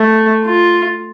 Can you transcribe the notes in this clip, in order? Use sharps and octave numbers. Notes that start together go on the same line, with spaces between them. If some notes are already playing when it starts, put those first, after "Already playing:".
Already playing: A3
F4